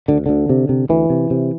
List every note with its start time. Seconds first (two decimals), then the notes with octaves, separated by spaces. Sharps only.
0.08 D2 D3
0.26 D2 D3
0.49 C3
0.69 C3
0.89 D2 E3
1.10 C3
1.30 C3